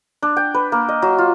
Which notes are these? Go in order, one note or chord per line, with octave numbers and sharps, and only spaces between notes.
D4
G5
B4
A#3
D#5
F#3
F4